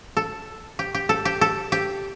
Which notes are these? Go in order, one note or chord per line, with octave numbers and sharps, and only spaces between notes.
A4
G4
G4
A4
G4
A4
G4